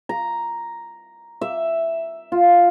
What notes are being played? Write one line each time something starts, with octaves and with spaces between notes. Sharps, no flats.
A#5
E5
F4